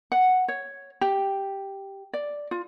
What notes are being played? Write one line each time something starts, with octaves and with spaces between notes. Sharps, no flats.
F#5
C#5
G4
D5
F4